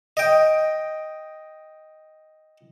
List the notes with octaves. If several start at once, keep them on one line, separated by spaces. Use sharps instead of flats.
D#5 G5